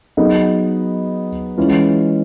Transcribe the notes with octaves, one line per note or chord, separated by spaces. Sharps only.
F#3 B3 D#4 G#4 B4
E3 G#3 C#4 F4